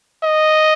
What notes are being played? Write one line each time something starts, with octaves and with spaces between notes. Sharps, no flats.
D#5